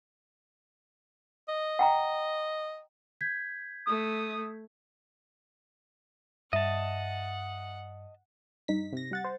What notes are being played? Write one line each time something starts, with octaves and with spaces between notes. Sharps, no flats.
D#5
F#5 G5 A#5
G6 G#6 B6
A3 D#6
G2 D#5 E5 F#5 A5
G2 D#4 B6
C3 A#6
G3 F#5 A6
C5